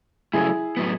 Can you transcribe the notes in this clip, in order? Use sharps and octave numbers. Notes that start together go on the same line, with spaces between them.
C#3 F#3 A3 E4 G#4
A2 F#3 B3